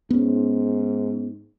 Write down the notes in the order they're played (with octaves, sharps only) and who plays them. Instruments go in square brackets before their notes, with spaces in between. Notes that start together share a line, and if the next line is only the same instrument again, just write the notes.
[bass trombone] G#2 [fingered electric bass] B3 C#4